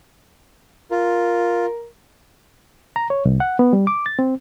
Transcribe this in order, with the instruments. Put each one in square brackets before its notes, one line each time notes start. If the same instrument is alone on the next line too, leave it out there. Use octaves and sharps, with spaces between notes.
[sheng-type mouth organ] F4 [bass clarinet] A#4
[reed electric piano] A#5
C#5
C2
F#5
B3
G3
D6
A6
C4